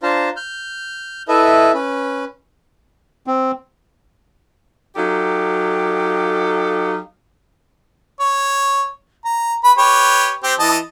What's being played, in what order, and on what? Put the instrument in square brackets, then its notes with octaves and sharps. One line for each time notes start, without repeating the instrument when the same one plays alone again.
[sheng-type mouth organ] D4 F4 C5 F5 A5 A#5
F6 G6
E4 A4 B4 D#5 E5
C#4 B4
[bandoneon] C4
[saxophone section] F#3 D#4 G4 A4 F5
[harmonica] C#5
A#5
B4 B5
G4 B4 C#5
C4 G4
E3 D#5 A5